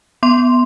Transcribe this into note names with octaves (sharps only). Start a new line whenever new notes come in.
B3 C6